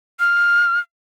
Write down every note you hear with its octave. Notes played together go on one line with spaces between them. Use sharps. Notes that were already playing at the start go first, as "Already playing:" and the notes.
F6